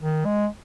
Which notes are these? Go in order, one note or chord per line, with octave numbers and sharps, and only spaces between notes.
D#3
G#3